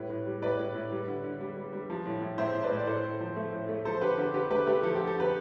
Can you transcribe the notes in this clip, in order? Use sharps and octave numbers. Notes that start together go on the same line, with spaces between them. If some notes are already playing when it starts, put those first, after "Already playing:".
Already playing: A2 G3 B4
A2
G3
A2 B4 D5
A2
A2
G3
D3
D3
G3
G3
G3
F3
A2
A2
A2 C5 E5
A2
B4 D5
A2
D5
A2 A4 C5
A2
F3
A3
A2
A3
F3 A4 C5
D3 G4 B4
D3 G4 B4
D3 G4 B4
A3 G4 B4
A3 G4 B4
F3 A4
D3 G4
A4
D3 G4 B4